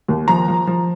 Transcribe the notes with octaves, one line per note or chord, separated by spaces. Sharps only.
D#2
F3 A#5
F3
F3